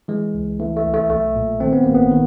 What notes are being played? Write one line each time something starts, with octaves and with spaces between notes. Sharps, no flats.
E3 G#3
C#2
E3 A3
A3
C2
A3
B1 A3
A#2
D#3 C4
B3
G#1 A#3
B3
D#3